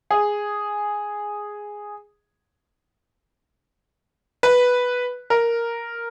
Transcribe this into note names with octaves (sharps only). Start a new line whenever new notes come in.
G#4
B4
A#4